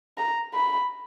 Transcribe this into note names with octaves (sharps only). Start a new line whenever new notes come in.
A#5
B5